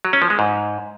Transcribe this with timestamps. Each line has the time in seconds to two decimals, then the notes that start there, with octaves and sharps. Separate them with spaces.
0.05 F#3
0.13 C#4
0.22 F3
0.30 G#3
0.39 G#2